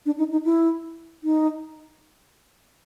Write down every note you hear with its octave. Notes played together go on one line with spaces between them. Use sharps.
D4
D#4
D#4
E4
D#4